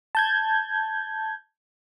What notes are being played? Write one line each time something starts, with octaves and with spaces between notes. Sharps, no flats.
A5 G6 G#6